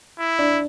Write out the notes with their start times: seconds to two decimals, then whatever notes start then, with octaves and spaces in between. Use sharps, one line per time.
0.19 E4
0.39 D4